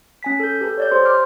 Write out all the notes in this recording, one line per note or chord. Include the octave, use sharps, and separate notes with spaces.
C#4 G#5 B6
A4 G6
G4 A4 B4
C#5 D5 G6
G4 C5 C6
C6 D6 F6